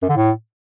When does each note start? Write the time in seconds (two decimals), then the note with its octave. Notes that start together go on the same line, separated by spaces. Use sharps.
0.02 F#2
0.09 D3
0.16 A2